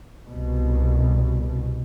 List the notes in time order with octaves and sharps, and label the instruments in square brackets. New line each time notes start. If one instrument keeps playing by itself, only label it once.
[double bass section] C2 B2